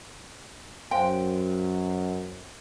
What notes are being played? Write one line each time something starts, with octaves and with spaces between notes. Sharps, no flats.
F#2 C5 F5 G5 C6